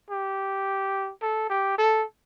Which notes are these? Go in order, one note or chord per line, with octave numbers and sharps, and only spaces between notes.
G4
A4
G4
A4